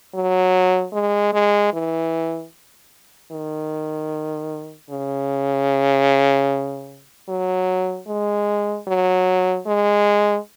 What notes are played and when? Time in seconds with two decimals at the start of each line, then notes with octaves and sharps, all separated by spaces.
0.15 F#3
0.93 G#3
1.33 G#3
1.73 E3
3.31 D#3
4.90 C#3
7.28 F#3
8.07 G#3
8.88 F#3
9.66 G#3